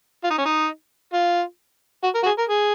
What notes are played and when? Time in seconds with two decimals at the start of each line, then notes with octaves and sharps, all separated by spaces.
0.24 F4
0.31 D#4
0.38 C#4
0.45 D#4
1.14 F4
2.03 F#4
2.15 A#4
2.23 F#4
2.26 G#4
2.39 A#4
2.49 G#4